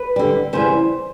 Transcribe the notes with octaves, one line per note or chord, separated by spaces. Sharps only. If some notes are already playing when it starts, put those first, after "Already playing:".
Already playing: B4
D3 G3
C#3 E3 G3 C5